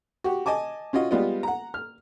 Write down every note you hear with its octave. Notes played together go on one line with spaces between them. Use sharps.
F#4 G4
D#5 G#5 A5 D6
C#4 F4 F#4 D#5
G3 G#3 B3 F4 D5 D#5
F#5 A#5
F6